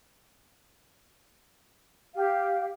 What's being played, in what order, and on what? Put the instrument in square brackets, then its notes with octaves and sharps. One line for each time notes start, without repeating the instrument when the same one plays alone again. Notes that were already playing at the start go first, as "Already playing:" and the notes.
[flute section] G4 F5